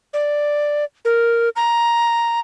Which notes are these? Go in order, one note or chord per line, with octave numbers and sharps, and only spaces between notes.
D5
A#4
A#5